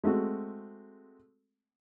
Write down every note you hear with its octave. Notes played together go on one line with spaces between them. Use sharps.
G#3 A3 C4 F#4